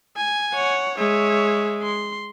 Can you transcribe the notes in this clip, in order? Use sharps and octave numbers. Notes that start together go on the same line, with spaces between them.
G#5
C#5 F#5
G#3 C#5 E5
C6